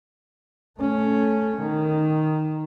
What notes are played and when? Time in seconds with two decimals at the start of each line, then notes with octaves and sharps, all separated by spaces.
0.79 A3 C#4
1.61 D#3